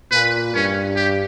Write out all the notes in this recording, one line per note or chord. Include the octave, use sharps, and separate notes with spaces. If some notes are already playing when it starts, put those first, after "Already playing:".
A#2 B4
G2 C#4
G4